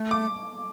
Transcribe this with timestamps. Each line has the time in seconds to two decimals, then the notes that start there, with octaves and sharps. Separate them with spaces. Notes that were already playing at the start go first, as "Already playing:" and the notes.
Already playing: A3
0.11 D6